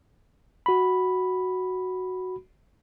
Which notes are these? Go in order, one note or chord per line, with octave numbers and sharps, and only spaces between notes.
F#4 B5